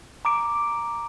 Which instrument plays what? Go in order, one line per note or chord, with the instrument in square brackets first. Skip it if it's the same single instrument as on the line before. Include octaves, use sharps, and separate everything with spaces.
[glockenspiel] A#5 D6 D7